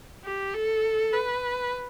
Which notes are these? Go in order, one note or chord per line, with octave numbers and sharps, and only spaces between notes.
G4
A4
B4